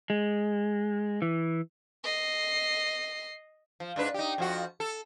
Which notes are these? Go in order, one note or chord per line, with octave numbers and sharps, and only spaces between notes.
G#3
E3
D#5 C7
F3
G#2 D4 B4
D#4 G4
F2 F3 F#4
A4